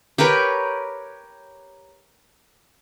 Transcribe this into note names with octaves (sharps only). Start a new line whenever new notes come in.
G4 A#4 B4 C#5